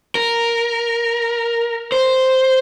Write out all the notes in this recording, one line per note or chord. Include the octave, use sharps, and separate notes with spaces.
A#4
C5